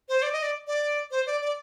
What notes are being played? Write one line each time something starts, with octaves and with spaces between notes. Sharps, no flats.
C5
D5
D#5
D5
D5
C5
D5
D5